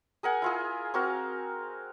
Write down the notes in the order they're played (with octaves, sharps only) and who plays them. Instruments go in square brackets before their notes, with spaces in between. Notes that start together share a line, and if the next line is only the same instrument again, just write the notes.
[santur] G#4 A#4 F#5 G#5
E4 F4 G#4
C4 F#4 A#4 F5